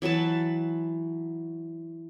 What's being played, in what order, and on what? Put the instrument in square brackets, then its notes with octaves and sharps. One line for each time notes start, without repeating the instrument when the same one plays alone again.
[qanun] E3 F#3 B4 A5